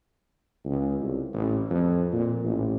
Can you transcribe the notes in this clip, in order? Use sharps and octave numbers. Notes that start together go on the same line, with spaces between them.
C#2
C2
A1
F2
A#2
A1